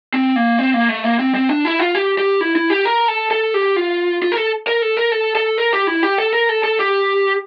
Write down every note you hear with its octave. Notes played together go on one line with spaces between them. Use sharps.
C4
A#3
C4
A#3
A3
A#3
C4
C4
D4
E4
F4
G4
G4
E4
E4
G4
A#4
A4
A4
G4
F4
F4
A#4
A4
A#4
A4
A#4
A4
A4
A#4
G4
E4
G4
A4
A#4
A4
A4
G4